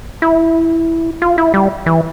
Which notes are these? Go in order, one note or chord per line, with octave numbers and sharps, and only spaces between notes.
E4
F4
E4
G3
E3